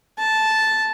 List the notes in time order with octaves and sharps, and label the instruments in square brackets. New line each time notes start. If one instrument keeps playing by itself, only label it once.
[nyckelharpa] A5